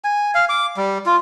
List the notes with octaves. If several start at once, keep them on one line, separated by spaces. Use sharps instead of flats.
G#5
F5
D6
G3
F4